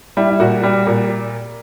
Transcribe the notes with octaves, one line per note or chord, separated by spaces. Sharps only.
G3 E4
E4
A#2 F#4
G3
A#2